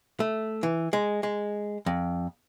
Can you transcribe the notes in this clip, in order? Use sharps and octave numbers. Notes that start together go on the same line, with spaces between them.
A3
E3
G#3
G#3
F2